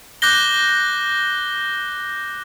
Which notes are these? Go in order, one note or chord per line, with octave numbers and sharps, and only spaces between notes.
D6 F#6 G6 A#6 G7